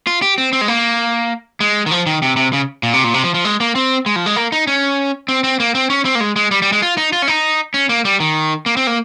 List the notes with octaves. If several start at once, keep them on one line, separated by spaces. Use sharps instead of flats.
F4
G4
C4
C4
G#3
A#3
G#3
D#3
F3
D#3
C3
C3
C#3
A#2
C3
A#2
C3
F3
F3
G#3
A#3
C4
G#3
F3
G#3
A#3
D#4
C#4
C4
C4
A#3
C4
C#4
C4
A#3
G#3
G#3
G3
G3
G#3
F4
D#4
F4
C#4
D#4
C#4
A#3
G3
D#3
A#3
C4
A#3